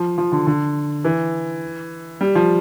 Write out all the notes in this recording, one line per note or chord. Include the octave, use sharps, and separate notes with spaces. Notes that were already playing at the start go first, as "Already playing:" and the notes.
Already playing: F3
F3
D3
D3
E3
G3
F3